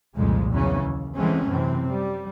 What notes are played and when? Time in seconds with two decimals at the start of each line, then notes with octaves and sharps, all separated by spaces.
0.15 C2 F2 A#2 C#3 F3 G#3
0.51 E2 C#3 E3 F#3 C#4
0.83 D#2
1.16 E3 F#3 G#3 A3 C4 C#4
1.48 F#2 C3 E3 C4
1.88 G3